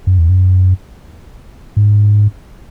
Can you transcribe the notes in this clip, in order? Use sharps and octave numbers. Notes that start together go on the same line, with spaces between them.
F#2
E2
F#2
G#2